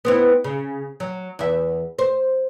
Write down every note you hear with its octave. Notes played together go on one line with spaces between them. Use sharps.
B3 C4 E4
C#3
F#3
E2 E5
C5